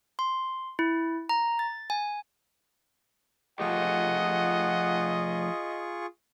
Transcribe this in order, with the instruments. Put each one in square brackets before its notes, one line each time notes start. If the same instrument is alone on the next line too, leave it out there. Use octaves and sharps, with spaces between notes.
[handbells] C6
E4
A#5
A6
G#5
[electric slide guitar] F3 A3 G4 [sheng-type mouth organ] F4 G#4 C#6 [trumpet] D#5 [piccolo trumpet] F#5